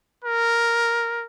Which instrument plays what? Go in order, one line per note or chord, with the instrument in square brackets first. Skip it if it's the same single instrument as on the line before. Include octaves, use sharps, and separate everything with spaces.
[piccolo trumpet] A#4